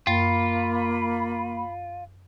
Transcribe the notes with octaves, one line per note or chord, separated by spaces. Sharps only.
F#2 A#3 F4 B5